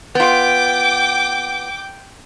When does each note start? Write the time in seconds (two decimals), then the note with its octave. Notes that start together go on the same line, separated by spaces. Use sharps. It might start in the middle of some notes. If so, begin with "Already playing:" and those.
0.15 B3 F4 G5 D6